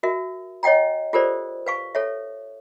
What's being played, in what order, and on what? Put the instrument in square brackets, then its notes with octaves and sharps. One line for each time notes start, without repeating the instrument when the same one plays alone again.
[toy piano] F#4 A#4 E5
C#5 D#5 F#5 G5 A#5
F4 G4 A4 A#4 C5 D5
B4 F5 C#6
A4 C#5 E5